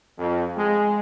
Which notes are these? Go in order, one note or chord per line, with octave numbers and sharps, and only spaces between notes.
F2
G#3